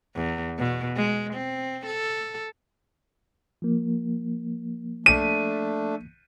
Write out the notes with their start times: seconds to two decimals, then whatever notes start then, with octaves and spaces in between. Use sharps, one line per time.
0.15 E2
0.58 B2
0.96 G#3
1.34 C4
1.86 A4
3.62 F3 A#3
5.06 A3 D4 D#7